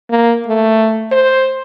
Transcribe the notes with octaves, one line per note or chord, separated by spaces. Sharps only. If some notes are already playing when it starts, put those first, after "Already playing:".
A#3
A3
C5